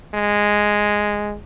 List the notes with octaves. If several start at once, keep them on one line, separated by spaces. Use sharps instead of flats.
G#3